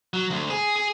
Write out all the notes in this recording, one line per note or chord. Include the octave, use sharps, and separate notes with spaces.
F#3
D2
G#4
G#4